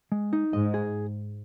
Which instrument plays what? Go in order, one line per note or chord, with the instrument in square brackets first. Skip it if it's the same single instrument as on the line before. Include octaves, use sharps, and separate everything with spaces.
[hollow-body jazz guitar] G#3
D#4
[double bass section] G#2 [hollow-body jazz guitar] D#5
[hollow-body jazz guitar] G#4